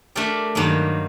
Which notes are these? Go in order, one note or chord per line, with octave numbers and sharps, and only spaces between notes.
A3 D4 G4 A#4 D5
G2 D#3 F#3 A#3 D#4